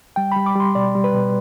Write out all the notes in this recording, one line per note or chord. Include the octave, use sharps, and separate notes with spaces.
G3 G5
G3 B5
D6
G3 C6
B2 D5
G3
B4
B2